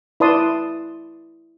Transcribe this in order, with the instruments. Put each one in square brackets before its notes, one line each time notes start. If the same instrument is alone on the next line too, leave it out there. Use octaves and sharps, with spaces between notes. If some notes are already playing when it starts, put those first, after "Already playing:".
[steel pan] E4 B4 D5 A5 C6 D#6